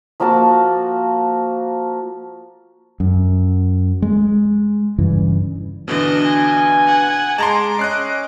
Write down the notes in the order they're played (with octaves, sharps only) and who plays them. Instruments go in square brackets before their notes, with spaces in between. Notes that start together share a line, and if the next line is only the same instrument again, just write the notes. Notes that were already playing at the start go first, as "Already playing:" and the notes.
[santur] F3 A#3 F#4 A5
[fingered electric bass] F#2
G#3
G2 C#3 E3
[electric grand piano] B2 D3 E3 [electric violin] D4 D#5
[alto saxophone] G#5
[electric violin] F#5
[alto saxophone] G#3 [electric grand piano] A5 A#5 C6 [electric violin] D6
[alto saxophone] C#4 [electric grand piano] D#5 F#6 C7